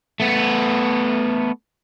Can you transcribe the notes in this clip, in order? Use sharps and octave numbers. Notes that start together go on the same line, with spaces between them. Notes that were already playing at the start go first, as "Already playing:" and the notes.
A3 B3